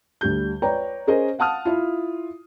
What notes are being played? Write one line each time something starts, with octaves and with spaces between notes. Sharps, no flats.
D2 G3 G6
B4 C#5 D5 G5 A#5
C#4 G#4 A#4 C5 D#5
F5 F#5 A5 D#6 F6
E4 F4